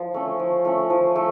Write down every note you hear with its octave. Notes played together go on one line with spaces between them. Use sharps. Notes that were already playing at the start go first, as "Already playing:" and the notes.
Already playing: F3
A3 C#4
F3
A3 C#4
F3
A3